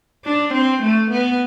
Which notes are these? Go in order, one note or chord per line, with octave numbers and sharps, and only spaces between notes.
D4
C4
A3
B3